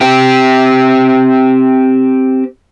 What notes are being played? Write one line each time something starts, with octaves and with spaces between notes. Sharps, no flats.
C4 G4